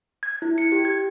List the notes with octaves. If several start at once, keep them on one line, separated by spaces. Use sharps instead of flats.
G#6
E4
C#7
G4
G#6